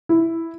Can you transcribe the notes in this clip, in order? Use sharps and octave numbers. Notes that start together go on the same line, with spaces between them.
E4